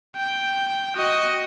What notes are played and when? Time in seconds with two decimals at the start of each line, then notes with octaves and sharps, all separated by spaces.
0.16 G5
0.96 F#4 D#5